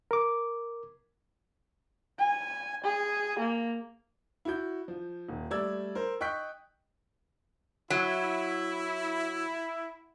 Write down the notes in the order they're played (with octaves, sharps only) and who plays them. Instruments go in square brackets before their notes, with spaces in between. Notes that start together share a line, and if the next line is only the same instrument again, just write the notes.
[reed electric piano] A#4 D6
[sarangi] G#5
G#4
A#3
[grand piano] E4 F#4 G6
F3
D#1
G3 A3 D5 E6 G#6
A#4 C5
D#5 G5 C#6 F#6 G6 B6
[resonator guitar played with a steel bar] F#3 [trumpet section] E4